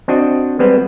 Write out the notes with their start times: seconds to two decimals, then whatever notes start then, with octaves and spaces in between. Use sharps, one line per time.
0.08 C4 D4 F#4 D#5
0.59 G3 G#3 B3 C4 B4